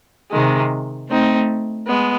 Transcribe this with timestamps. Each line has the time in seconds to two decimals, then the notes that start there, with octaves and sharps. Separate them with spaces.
0.31 C3 D#3 G#3
1.09 A3 C4 D#4
1.87 G#3 B3